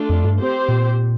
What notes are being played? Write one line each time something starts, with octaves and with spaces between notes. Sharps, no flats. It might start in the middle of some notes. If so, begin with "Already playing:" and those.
Already playing: A3 D4 F4 A4
F2
G2
C4 G4 C5
A#2